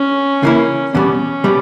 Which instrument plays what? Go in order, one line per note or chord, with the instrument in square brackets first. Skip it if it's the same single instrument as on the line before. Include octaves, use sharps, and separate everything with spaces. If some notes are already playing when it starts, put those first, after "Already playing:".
Already playing: [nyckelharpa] C#4
[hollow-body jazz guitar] C#3 E3 A#3 E4
[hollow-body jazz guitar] E2 B2 G3 [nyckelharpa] C#4
[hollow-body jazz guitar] B2 G3